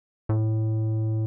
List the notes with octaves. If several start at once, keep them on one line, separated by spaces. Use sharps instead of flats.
A2